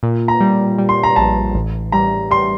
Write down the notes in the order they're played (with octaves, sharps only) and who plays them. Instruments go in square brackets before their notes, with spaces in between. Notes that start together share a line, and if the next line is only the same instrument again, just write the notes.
[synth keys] A#2
[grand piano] A#5
[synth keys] G3
G3
[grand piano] C6
A#5
[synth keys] A#1 [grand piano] A5
[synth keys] A1
[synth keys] G3 [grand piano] A#5
[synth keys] G3 [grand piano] C6